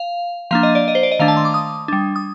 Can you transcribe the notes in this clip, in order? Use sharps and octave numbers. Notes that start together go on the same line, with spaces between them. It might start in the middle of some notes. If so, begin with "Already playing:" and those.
Already playing: F5
F3 A#3 D4 F5
D#5
D5
D#5
C5
D5
D#5
D#3 A3 D4 F5
A5
C6
D6
D#6
G3 D4
D#6